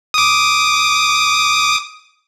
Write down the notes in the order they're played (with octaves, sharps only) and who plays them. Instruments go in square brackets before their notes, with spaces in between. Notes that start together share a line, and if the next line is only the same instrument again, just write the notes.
[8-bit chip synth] D6 D#6